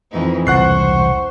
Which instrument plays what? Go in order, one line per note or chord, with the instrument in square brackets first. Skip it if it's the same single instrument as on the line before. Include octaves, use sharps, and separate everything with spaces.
[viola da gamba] F2 E3 D#4
[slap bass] E1 C2 [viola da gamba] C5 [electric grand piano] F#5 F#6 C7 [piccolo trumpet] C#6